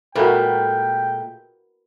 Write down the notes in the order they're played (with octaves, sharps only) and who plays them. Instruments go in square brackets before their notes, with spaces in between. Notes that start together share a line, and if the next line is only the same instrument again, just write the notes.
[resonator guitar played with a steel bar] A#2 G#3 A3 [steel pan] F#4 A#4 B4 [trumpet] G5